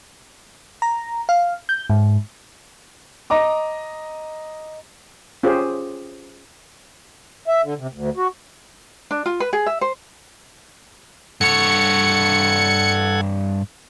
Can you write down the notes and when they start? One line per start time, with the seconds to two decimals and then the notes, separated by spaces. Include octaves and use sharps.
0.82 A#5
1.29 F5
1.69 G6
1.90 G#2
3.30 D#5 A#5 D6
5.43 C#4 F4 G4 G#4 C5
7.47 E5
7.63 D3
7.78 C3
7.93 D2
8.17 F#4
9.11 D4
9.26 F4
9.40 B4
9.53 G#4
9.66 E5
9.81 C5
11.41 G2 A4 C#5 F#5 G#6 C#7